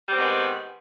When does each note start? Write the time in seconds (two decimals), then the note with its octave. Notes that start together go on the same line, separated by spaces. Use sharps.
0.09 G3
0.12 C4
0.14 B3
0.17 D#3
0.20 G#3